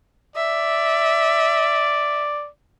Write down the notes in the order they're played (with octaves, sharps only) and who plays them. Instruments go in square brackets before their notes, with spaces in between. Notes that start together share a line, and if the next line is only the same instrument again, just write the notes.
[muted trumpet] D5 [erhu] E5